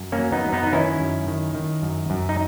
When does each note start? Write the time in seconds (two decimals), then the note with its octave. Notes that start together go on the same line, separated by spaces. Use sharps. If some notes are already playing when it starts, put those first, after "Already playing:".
Already playing: F#2
0.12 A#3 C#4
0.19 F#3
0.32 B3 D#4
0.46 F#2
0.53 B3 D#4
0.67 D#4
0.73 D#3 C#4 E4
1.00 F#2
1.27 D#3
1.55 D#3
1.82 F#2
2.10 F#2
2.29 D#4